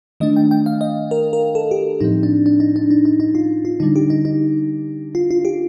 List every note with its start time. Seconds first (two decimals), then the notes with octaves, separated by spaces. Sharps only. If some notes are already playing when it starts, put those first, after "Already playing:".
0.20 D#3 A3 D4 D#5
0.36 G5
0.51 G5
0.66 F5
0.81 D#5
1.11 A#4
1.33 A#4
1.55 A4
1.71 G4
2.00 A2 F3 C4 D#4
2.23 D4
2.46 D4
2.60 D#4
2.76 D4
2.91 D#4
3.05 D#4
3.20 D#4
3.35 F4
3.65 F4
3.80 D3 G3 D4 D#4
3.96 G4
4.10 D#4
4.25 D#4
5.15 F4
5.31 F4
5.45 G4